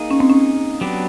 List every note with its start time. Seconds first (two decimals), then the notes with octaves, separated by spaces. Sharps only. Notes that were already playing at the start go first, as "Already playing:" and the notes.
Already playing: A#3 D#4 G#4
0.11 C#4
0.20 C4
0.30 C#4
0.81 F#3 B3 D4 G4